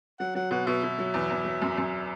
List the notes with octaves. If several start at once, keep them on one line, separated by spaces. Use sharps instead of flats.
F#3 F#5
F#3 F#5
B2 F#5
B2 E5
B2
F#3
E2
E2
F#3
F#2
F#2